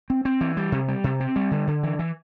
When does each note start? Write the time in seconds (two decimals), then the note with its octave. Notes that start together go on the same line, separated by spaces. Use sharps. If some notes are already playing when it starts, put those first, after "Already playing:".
0.10 C4
0.25 C4
0.41 E3
0.57 G3
0.72 C3
0.88 G3
1.04 C3
1.20 C4
1.36 G3
1.51 D3
1.67 D3
1.83 E3
1.99 E3